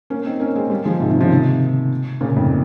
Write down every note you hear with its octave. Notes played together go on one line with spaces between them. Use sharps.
A#3 C#4
C4 D#4
A#3 C#4
G#3 C4
G3 A#3
F3 G#3
G#2 C3
C3 D#3
C#3 F3
C3 D#3
A#2 C#3
F2 G#2